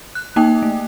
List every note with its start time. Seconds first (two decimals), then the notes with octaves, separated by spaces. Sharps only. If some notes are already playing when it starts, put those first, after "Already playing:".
0.15 F#6
0.36 A#3 D#4 G5
0.63 A3